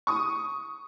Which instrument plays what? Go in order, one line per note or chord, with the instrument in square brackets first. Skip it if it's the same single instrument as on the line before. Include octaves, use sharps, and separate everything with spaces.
[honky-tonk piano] C#6 D#6